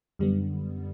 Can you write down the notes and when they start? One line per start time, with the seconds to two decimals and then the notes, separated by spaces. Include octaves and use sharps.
0.19 F#2 D3 G3 B3